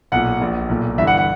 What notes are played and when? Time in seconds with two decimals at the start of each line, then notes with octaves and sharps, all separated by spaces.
0.12 B1 A#2 F#5
0.41 A#1 A#2
0.69 B1 A#2
0.98 G1 G2 E3 E5
1.07 F#5
1.17 F#5